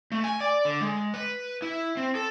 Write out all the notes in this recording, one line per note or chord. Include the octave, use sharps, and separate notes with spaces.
A3
G#5
D5
D3
G#3
B4
E4
C4
A4